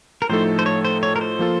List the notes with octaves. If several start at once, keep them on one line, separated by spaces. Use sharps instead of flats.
A#4
A2 F3 A3 D#4 A4 C5
C5
C#5
C5
C#5
A#4
C5
F3 A#3 F4 A4